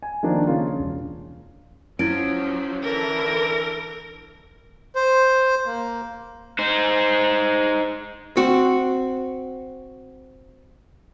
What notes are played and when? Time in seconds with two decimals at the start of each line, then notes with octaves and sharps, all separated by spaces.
0.03 G#5
0.23 D#3 F3 A#3 D4
0.47 C#3 A#3 F4
0.79 E1
1.99 F3 F#3 C#4 E4 D7
2.83 D3 E3 A4 A#4
4.95 C5
5.66 A#3
6.59 D#4 C5
8.37 C4 F#4